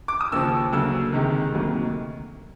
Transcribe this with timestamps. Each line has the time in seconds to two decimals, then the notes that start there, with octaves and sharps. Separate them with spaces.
0.08 D6
0.21 D#6
0.32 D#2 C#3 F3 E6
0.72 D2 C#3 F#3 A#3 E6
1.13 C#2 C3 D#3 G#3
1.52 D2 C3 D#3 F#3 A#3